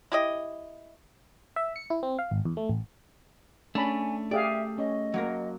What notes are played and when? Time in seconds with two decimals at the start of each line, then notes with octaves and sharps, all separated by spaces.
0.12 E4 G4 D#5
1.56 E5
1.76 C#7
1.90 E4
2.03 C4
2.19 F5
2.31 G#1
2.45 E2
2.57 A3
2.69 A1
3.75 A3 C#4 D4 G#5 B5
4.31 G4 G#4 D5 E5 F5
4.78 C#4 D#5
5.14 F#3 A#3 A#4